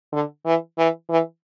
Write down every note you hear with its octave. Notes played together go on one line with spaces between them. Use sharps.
D3
E3
E3
E3